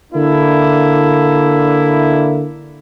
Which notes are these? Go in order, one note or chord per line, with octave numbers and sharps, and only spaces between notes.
D3 A#3 D4 E4